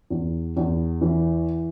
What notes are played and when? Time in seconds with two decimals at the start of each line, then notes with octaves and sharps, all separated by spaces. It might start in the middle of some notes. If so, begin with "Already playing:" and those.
0.10 E2
0.57 E2
1.01 E3